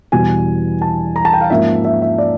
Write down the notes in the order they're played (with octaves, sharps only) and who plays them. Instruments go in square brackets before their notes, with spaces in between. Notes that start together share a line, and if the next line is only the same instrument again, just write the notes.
[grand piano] E2 B2 G3 B3 G#5
A5
A#5
A5
G5
F5
G#2 F3 A#3 C#4 E5
E5
E5
D5